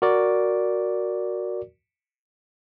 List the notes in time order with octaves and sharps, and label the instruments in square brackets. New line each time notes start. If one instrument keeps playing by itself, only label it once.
[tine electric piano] F#4 A#4 D5